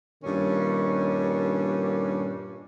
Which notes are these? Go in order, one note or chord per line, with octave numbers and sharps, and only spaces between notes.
G2 A#2 D#3 C#4 D4